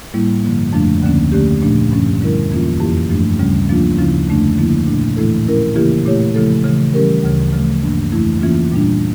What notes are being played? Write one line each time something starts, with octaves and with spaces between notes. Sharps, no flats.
A2 G3 A#3 E4
G2 D3 F3 A#3
F2 C#3 F3 A3 D4
D2 D3 F3 A#3 C#4
D3 A3 C#4 G4
A#2 F3 A3 D4
G2 F3 C#4
D3 G3 C#4 E4 A#4
E2 E3 A#3 C#4 F4
F2 E3 A#3 E4 G4
G2 F3 A3 D4
D2 C#3 G3 C#4
F3 A#3 D4 F4
D2 C#3 F3 C#4 E4
F2 D3 A3 D4
D3 F3 A#3 E4
A#2 A3 D4
A2 E3 A3 E4 A4
F3 C#4 E4 A#4
C#3 E3 A#3 E4 G4
A#2 A3 E4 G4 C#5
C#3 F3 A3 E4 A4
C#3 E3 A3
E3 G3 C#4 G4 A#4
D2 C#3 E3
C#3 F3 A3
G2 E3 A#3 D4
F2 E3 A3 E4
E3 A#3 C#4 F4
A#2 G3 D4